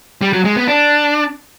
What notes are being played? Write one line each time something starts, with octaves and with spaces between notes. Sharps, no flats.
G3
F#3
G#3
B3
D4